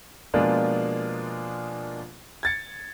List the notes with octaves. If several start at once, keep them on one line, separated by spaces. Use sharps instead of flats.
B2 F3 G#3 A#3 D4 F4
G#6 A6 C#7